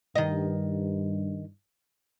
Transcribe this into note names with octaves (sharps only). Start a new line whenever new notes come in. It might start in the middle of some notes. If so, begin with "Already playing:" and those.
G2 D#3 D#5